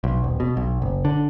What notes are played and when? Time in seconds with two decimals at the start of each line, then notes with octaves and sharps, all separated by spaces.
0.04 B1
0.24 D#1
0.40 B2
0.57 B1
0.82 F#1
1.05 D3